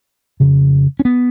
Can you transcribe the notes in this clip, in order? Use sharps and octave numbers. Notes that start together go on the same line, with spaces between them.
F2 C#3
C#4
B3